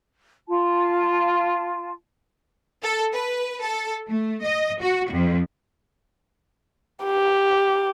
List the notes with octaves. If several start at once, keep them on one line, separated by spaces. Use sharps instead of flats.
F4 A5
A4
B4
A4
A3
D#5
F#4
F2
G4